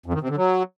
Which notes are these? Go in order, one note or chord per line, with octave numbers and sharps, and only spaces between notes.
F2
D#3
C3
D3
F#3